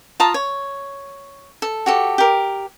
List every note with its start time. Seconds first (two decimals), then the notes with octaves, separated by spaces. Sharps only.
0.20 F4 A5 A#5 D#6
0.34 C#5
1.62 A4
1.86 F#4 G4 A4
2.18 G4 A#4